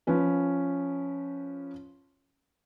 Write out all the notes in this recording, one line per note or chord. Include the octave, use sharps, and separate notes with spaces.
F3 C#4 B4